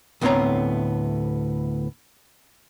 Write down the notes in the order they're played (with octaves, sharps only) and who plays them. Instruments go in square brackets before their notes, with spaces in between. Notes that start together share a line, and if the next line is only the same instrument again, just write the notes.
[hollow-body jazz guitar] D2 A2 B3 C4 C#5 A#5